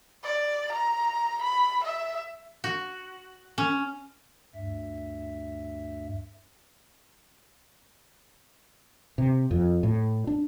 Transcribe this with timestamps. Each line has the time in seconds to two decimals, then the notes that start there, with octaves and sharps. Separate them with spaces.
0.24 D5
0.73 A#5
1.42 B5
1.84 E5
2.64 F#4
3.58 C#4
4.55 D2 G2 E5
9.18 C3
9.51 F2
9.83 A2
10.27 D4